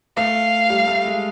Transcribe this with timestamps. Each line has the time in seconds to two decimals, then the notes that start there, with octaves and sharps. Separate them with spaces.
0.16 A3 F5
0.70 G3
0.87 A3
1.05 G#3